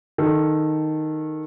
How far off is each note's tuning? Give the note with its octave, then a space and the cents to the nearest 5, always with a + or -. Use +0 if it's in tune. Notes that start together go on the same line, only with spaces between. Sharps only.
D#3 +0 A4 +0